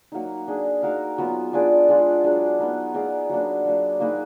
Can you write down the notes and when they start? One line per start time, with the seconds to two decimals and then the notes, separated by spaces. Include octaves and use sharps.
0.12 F#3 A#3 D#4
0.48 D4 G#4 D#5
0.83 D#4 F#4 A#4 F5
1.18 F#3 B3 F4
1.53 D4 F4 G#4 D5
1.89 G#3 D4 F4 G#4
2.24 F#3 D4 G#4
2.59 B3 D#4 A#4
2.94 D#4 G#4 D5 F5
3.29 F#3 A#3 D4
3.65 F#3 A#3 D4
4.00 A#3 D#4 G#4 B4